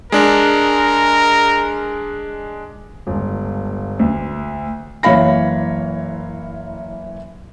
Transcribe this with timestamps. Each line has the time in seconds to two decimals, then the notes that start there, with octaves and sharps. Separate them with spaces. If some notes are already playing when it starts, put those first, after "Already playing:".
0.12 G#3 D4 A#4
3.06 G1 C#2
4.00 D2
5.03 F#1 E3 C#5 F5 B5 A#6